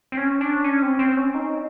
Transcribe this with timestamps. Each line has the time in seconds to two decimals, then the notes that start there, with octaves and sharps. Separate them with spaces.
0.12 C4
0.17 C#4
0.41 D4
0.64 C#4
0.82 C4
0.99 C4
1.17 C#4
1.35 D#4